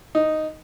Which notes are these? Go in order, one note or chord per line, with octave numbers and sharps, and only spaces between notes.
D#4